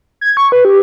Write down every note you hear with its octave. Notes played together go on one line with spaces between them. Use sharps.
G#6
C#6
B4
G4